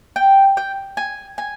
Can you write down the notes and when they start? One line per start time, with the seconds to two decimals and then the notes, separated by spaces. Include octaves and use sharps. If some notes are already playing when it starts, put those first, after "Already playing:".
0.16 G5
0.57 G5
0.97 G#5
1.38 G#5